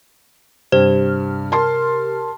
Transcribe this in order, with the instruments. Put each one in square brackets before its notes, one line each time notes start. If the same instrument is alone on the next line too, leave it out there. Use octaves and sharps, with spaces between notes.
[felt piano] G2 [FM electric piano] C3 G4 F6 [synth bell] C5
[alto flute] A#4 [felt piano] A5 C6